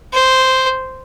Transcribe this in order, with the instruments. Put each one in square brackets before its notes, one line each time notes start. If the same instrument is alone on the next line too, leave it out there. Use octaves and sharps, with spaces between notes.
[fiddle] C5